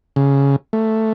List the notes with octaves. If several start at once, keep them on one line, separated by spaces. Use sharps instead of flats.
C#3
A3